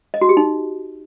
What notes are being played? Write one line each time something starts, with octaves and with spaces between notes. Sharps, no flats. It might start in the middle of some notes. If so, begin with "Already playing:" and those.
D#5
F#4
G4
D#4